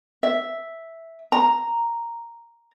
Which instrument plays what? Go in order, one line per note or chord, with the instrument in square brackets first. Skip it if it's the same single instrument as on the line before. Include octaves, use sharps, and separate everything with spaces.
[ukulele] E5
A#5